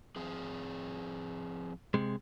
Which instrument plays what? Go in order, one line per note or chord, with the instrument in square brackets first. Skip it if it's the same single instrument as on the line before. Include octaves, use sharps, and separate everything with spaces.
[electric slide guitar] F3 C4 G#4
[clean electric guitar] C3 G#3